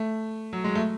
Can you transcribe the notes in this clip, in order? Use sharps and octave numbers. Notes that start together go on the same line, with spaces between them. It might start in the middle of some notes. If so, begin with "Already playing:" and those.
Already playing: A3
F#3
G#3
A3